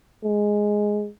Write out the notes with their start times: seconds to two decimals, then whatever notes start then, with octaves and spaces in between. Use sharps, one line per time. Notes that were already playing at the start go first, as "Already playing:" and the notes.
0.24 G#3